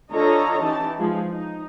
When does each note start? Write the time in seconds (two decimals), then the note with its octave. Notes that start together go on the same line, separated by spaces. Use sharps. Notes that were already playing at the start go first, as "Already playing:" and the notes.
0.12 D3 F4 A4 C#5 D#5 A#5
0.62 E3 C#4 D#4 G4 A5
0.98 F3 G#3 G#4
1.30 D#4